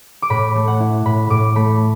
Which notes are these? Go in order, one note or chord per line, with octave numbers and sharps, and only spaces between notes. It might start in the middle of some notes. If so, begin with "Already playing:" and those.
D6
A2 B5
A3
F#5
E4
A2 B5
A2 D6
A3 B5